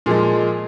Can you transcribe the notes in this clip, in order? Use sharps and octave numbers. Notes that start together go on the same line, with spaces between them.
A#2 F3 G#3 G#4